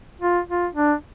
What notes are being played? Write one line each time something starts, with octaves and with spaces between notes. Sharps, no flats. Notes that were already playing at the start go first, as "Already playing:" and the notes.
F4
F4
D4